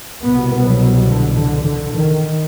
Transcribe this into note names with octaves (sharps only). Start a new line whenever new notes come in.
C2 B2 B3
F#3
D3
D3
D3
D#3